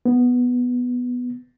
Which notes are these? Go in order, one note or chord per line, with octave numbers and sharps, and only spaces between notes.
B3